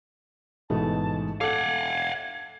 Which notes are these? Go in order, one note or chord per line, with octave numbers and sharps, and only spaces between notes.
A1 G#2 B2 A3 A5
A4 F5 F#5 D6 G#6